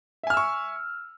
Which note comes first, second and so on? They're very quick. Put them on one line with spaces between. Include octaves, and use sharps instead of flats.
E5 G#5 F6 E6 C#6